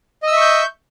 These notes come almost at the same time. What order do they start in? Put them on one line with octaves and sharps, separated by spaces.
D#5 E6 E5 C#6 G6